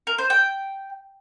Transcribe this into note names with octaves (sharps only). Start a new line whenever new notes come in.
A#4
C5
G5